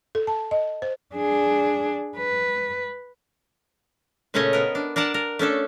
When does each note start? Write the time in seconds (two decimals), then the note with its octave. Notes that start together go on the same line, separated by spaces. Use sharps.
0.15 A4
0.27 A5
0.51 D#5
0.82 C5
1.15 D4 G#4
2.17 B4
4.34 A#2 C#3 A3 C#4 C#5 D#5
4.53 B3 A#4
4.75 D4
4.96 D4 A#4 D5 F#5 A5
5.14 A#4
5.39 A3 C#4 D4 A4